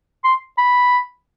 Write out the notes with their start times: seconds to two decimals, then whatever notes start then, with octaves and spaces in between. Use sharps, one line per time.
0.24 C6
0.58 B5